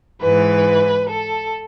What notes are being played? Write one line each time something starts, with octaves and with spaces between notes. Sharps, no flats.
G#2 E3 B4
A4